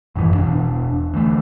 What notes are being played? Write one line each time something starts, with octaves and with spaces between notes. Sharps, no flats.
A1 F#2 D#3 E3
E1 D4
D2 E3 A3